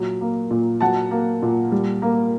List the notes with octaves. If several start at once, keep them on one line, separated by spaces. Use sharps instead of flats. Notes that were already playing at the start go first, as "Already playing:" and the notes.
Already playing: A#2 F#3
A#3
A#2
F#3 F#5 A5
A#3
A#2
G3
A#3